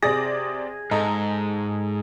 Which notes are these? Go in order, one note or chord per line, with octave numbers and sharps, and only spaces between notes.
C3 G#4 D5 A#6
G#2 A4 D#5 A#5